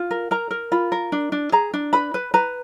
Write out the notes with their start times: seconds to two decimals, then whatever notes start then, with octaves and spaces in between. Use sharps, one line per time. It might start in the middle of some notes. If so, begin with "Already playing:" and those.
Already playing: F4
0.11 A#4
0.31 A#4 A#5
0.51 A#4
0.72 F4 B5
0.92 A#4
1.12 D4
1.32 D4
1.52 G#4 A#5
1.73 D4
1.93 B4 B5
2.14 B4
2.34 B4 A#5